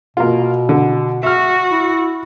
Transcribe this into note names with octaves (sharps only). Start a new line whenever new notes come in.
B2 A#3 F4
D3
F#4 E5 F6
E4